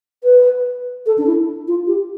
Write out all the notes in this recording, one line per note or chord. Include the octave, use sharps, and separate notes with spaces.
B4
A4
D4
E4
F4
G4